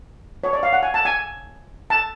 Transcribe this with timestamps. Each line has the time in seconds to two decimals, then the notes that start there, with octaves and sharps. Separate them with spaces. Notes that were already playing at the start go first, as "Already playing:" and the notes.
0.44 C#5
0.53 D5
0.63 F5
0.73 F#5
0.83 G#5
0.94 A5
1.05 G#5
1.90 A5